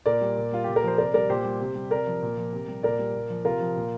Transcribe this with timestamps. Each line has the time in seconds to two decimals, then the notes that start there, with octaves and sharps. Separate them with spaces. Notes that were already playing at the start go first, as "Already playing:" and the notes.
0.06 A#2 A#4 D5
0.21 G3
0.37 A#2
0.52 G3 F4
0.64 A#2 G4
0.76 A#4
0.84 F3 C5
0.98 C3 A#4 D5
1.14 G3 A#4 D5
1.30 A#2 G4 C5
1.44 G3
1.60 C3
1.75 G3
1.91 C3 A#4 D5
2.07 F3
2.22 A#2
2.37 F3
2.53 C3
2.68 G3
2.83 A#2 A#4 D5
2.99 G3
3.15 A#2
3.30 F3
3.45 C3 F4 A#4
3.60 F3
3.76 A#2